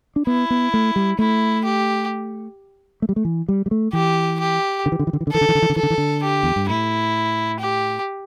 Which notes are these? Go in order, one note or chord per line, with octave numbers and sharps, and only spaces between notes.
D4
B3 E4
B3
A3
G3
A3 E4
G4
A3
G3
A3
E3
G3
G3
A3
E3 G4
G4
D3
E3
D3
E3
D3
E3
D3
E3 A4
D3
E3
D3
E3
D3
E3 A4
D3
E3
D3
G4
E2
G2
A2 E4
G4